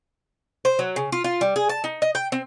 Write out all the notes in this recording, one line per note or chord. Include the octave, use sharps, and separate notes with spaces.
C5
F#3
C#3
F4
F4
G3
G#4
A5
D#4
D#5
G5
C4